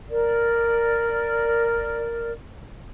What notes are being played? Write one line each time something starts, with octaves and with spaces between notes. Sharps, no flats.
A#4 D5